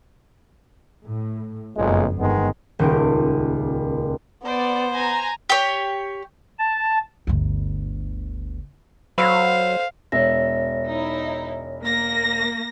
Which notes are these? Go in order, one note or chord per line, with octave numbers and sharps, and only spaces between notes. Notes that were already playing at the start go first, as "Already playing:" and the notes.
A2
F#1 B1 F2 A#2 G#3
G1 D#3 G#3 B3
D#1 C#2 D#4 G5 D7
B3 C5 D5
G#5 A#5
G4 C#5
A5
G1 D2
F#3 C5 F5 B5 C6 E6
E1 C#5 E5 A#6
D#4 E4
A#3 A#6